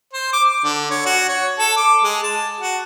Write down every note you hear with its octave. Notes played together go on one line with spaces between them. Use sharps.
C5
D6
D6
D3
C#5
F#4
C#5
A4
D6
G#3
A5
F#4